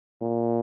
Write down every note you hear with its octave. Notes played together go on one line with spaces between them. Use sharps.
A#2